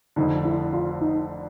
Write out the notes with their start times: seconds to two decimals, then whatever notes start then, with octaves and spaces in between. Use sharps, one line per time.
0.16 F1 F2 D3 D#4
0.45 E4
0.73 F4
1.01 D#4